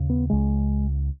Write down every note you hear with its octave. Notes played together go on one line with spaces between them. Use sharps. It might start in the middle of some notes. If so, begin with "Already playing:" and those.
Already playing: D#2 C#3
B3
C#2 C#3 G#3